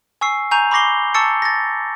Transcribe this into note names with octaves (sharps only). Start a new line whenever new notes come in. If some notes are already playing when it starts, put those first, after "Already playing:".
G#5 C#6 E6 C7
G#5 A#5 C#6 G6 F7
B5 C#6 D6 A#6 C7 G7
A5 C#6 E6 A6 C#7
A6 A#6